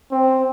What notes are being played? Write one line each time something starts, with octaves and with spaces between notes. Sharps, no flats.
C4